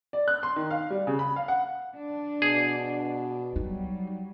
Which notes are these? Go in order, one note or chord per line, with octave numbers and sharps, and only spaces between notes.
D5
F#6
C6
D#3
F5
G3
C#3
B5
F5
F#5
D4
B2 G#4
F#3 G3 D#4